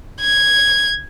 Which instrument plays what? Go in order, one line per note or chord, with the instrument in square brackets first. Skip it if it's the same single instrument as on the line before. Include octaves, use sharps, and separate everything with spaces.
[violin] G#6